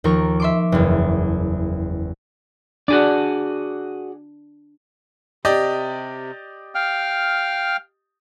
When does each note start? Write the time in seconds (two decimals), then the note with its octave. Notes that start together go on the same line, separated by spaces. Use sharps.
0.04 D#2 F3 A#4 C#6
0.40 E5 C6 D6
0.72 F#1 E2
2.88 D4 F#4 G#4 D5
5.45 C3 G4 D5 D#5
6.75 F5 G5 F6